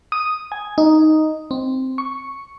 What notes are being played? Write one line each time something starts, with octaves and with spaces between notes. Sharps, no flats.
D#6
G#5
D#4
C4
C#6